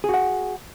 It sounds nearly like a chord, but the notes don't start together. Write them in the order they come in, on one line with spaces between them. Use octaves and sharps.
G#4 F#4 F#5